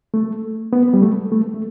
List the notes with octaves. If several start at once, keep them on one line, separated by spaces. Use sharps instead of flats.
A3
B3
G3
A3
A3
A3